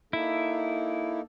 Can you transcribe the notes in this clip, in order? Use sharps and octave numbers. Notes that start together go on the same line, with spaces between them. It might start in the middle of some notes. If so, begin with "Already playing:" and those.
A#3 D#4 E4 A4